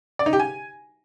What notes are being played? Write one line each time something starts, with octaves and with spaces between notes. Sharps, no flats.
D5
D#4
G4
G#5